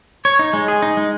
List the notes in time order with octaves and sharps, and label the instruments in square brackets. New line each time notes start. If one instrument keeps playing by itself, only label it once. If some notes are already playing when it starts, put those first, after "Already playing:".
[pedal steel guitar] C#5
D#4
G#3
G#4
D#4
G#3